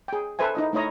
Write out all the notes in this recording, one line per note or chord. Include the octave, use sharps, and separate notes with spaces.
G#4 G5
A4 B4 C5 E5 G#5
D#4 E4 D#5
A3 D#4 E4 C#5 D#5 A#5